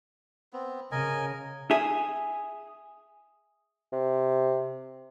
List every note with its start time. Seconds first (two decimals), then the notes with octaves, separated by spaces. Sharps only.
0.53 B3 C4
0.92 C#3 A#4 D#5 G#5
1.71 G#4 E5
3.92 C3